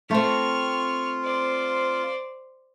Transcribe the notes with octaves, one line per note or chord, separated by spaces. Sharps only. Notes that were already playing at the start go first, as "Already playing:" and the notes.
A3 C4 F4 C#6 F6
C5 D5